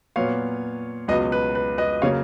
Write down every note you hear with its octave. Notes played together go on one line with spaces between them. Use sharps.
A#2 F#3 B3 C#5 F5
C#2 B2 F#3 B4 D#5
B4
B4
B4 D#5
C#3 F#3 A#3 C#5 F5